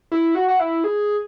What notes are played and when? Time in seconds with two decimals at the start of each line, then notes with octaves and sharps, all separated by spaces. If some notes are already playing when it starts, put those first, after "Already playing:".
0.12 E4
0.35 F#4
0.48 F#4
0.59 E4
0.84 G#4